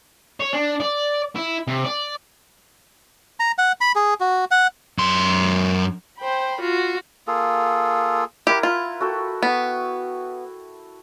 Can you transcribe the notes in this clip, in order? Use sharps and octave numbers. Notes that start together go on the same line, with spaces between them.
C#5
D4
D5
E4
C3
D5
A#5
F#5
B5
G#4
F#4
F#5
F#2 C6
C5 G5 B5
F4 F#4
A#3 F4 G#4 A4
E4 G4 A#4 F#5
F4
F#4 A4 G5
B3